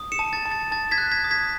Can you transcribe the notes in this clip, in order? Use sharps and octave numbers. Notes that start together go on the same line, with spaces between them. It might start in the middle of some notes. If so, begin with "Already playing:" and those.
Already playing: D#6
C#7 E7
A5
A6
A5
A6
A5 A6
G#6 B6
F#6
G#6 B6
D#6
G#6 B6